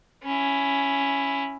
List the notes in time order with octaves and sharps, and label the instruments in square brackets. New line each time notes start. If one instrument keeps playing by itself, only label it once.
[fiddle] C#4 E4